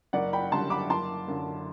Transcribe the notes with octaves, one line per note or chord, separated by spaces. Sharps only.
F#1 D5 F#5
G5 B5
F#2 D3 G3 A5 C6
B5 D6
F#1 A5 C6
F#2 D3